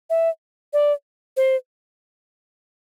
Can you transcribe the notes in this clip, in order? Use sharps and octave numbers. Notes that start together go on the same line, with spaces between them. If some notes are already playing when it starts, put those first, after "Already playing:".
E5
D5
C5